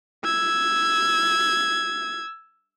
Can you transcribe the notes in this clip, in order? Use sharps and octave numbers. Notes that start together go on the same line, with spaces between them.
E6 G#6